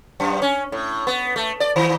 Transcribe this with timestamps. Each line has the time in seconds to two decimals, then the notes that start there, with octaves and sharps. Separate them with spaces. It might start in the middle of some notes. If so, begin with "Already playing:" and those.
0.20 F#2
0.42 C#4
0.72 A2
1.07 B3
1.36 A3
1.60 D5
1.76 D#3